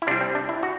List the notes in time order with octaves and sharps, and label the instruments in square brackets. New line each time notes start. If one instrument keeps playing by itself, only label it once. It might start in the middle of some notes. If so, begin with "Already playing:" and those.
[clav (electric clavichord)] E4
C3 G3 D4
C4
D4
E4
F#4